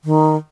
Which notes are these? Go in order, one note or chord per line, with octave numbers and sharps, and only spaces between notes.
D#3